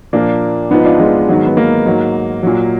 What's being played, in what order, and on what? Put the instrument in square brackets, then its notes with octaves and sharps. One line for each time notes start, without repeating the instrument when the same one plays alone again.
[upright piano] A#2 F3 A#3 D4
G#2 F3 B3 D#4
D4 F4
G#3 B3
G#2 D#3 F#3
B3
A#3
G#2 F#3
A#2 F#3